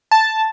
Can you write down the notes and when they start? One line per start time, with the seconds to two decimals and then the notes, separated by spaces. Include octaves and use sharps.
0.11 A5